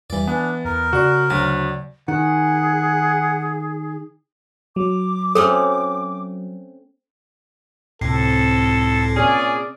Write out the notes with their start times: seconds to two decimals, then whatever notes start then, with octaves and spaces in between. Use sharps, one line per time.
0.10 E2 E3 G3 D5
0.27 B3 D4 G#5
0.65 E2 A#4 A#5
0.93 C#3 F#4 D5
1.30 D2 F#3
2.08 D#3 G#4 F#5
4.76 F#3 D6
5.35 A3 C4 C#4 A4
8.01 C#2 A2 C3 A4 C7
9.16 A#2 C#4 G#4 D5